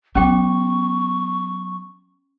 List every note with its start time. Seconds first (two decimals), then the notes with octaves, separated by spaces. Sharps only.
0.15 F#3 B3 C#4 G5 C#6 D6